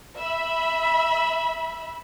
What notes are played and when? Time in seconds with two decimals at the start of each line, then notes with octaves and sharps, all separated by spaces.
0.16 E5 B5